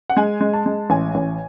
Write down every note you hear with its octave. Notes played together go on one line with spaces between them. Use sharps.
F#5
G#3 G#5
G#3
A5
G#3
A1 G#5
A1